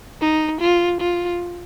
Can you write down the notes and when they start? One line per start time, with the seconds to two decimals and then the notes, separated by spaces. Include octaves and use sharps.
0.21 D#4
0.61 F4
1.00 F4